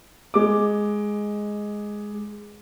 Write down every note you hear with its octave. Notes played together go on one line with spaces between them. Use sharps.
G#3 D6